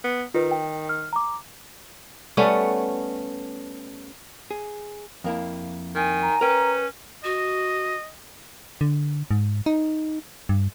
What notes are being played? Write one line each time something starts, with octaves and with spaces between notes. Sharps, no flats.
B3
D#3 F4 B4
G5
F6
A#5 D6
G3 A3 B3 C#4
G#4
F2 A#3 E4
D#3 G#5
A#5
C#4 A#4 B4 G5
F#4 D#5
D3
G#2
D#4
G2